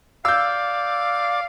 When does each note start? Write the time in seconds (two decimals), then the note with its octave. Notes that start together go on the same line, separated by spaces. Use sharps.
0.25 D5 F5 E6 G6